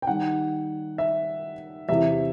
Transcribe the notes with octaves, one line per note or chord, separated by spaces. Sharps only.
G5
D#3 G3 D#4 F#5
E5
E2 C3 E3 E5